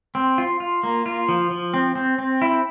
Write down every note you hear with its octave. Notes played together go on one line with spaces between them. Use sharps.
C4
F4
F4
A#3
F4
F3
F3
C4
C4
C4
E4